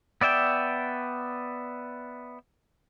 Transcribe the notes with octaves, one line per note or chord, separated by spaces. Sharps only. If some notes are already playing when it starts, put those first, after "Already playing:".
B3 D5 E5 G5